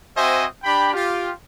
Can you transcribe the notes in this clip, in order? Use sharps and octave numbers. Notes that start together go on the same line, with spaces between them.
C4 F#4 C5 D#5 E5 G#5
D4 G4 G5 B5
F4 G4